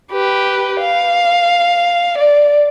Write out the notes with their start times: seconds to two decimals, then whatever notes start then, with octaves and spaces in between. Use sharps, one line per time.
0.12 G4 B4
0.80 F5
2.18 D5